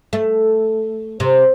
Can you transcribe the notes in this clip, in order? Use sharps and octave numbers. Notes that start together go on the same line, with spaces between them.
A3
C3